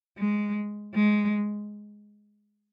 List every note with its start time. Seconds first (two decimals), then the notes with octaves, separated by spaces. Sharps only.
0.18 G#3
0.95 G#3